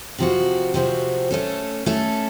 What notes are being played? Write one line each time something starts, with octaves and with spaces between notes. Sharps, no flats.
C3 F3 C4 F#4
C3 F3 C4 F#4
A3 C#4 A4
A3 C#4 A4